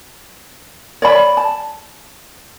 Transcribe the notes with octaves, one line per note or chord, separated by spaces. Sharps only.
C#5 D5 B5
A5